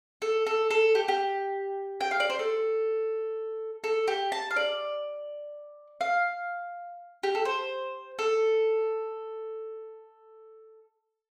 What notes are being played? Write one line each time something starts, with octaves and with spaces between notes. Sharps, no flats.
A4
A4
A4
G4
G4
G5
F5
D5
C5
A4
A4
G4
A5
F5
D5
F5
G4
A4
C5
A4